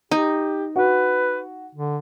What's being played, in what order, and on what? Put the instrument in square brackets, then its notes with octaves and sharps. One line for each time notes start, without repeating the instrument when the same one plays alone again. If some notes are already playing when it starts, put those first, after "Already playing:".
[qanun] D#4 [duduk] G4
[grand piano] F#4 [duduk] B4
[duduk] D3